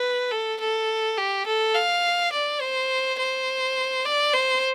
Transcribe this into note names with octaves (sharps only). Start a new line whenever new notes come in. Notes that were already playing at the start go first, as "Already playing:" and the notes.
Already playing: B4
A4
A4
G4
A4
F5
D5
C5
C5
D5
C5